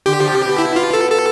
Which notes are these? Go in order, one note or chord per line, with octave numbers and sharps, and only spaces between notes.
D3 G4
D3 F3
C3
B2
E4
F4
A4
A4